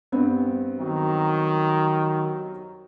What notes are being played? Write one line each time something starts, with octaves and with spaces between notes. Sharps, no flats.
G2 B3 C4
D#3 F#3